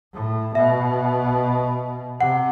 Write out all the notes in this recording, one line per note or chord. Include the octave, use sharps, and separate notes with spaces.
A2
B2 E5
C3 F#5